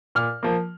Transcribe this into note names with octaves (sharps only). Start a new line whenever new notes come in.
A#2 F6
F3 A#3